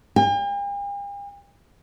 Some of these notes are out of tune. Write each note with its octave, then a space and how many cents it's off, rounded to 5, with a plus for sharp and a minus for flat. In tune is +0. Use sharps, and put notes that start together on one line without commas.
G5 +45